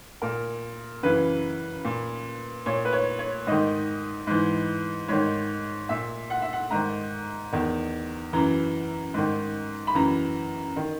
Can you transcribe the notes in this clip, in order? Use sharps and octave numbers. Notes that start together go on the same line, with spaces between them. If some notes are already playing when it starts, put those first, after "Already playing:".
A#2 A#4
F#2 C#3 E3 B4
A#2
A#2 C#5
B4
C#5
C#5
G#2 D#3 D#5
G#2 E3
G#2 D#3 C#5
A#2 E5
F#5
E5
F#5
G#2 D#3 A#5
E2 D#3
F#2 E3 A#5
G#2 D#3
B5
F#2 E3 A#5
D#3